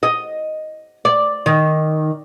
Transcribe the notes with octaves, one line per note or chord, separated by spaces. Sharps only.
D#5
D5
D#3